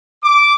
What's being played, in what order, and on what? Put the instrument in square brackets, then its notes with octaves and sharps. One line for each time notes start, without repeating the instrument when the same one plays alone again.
[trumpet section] D6